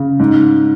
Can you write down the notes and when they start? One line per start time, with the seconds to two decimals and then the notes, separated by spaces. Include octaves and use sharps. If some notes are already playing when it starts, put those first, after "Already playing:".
Already playing: C#3
0.19 G#2